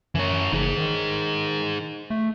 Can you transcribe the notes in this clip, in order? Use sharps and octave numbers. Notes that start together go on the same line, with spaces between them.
F#2 E3 C#5
F#1 D#4 G#4
D#3
A3